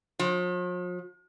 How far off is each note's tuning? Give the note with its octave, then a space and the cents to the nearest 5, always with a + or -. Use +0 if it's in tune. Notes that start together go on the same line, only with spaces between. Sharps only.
F3 +45